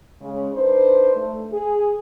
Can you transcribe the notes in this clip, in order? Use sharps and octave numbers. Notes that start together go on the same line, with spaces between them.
C#3 G#3
D4 D#4 B4 C5
A3
G#4